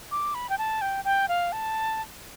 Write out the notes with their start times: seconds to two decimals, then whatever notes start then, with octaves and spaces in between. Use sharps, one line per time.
0.11 D6
0.35 B5
0.49 G5
0.58 A5
0.81 G5
1.05 G5
1.28 F5
1.52 A5